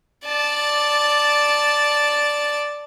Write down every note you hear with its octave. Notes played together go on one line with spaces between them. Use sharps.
D5 A5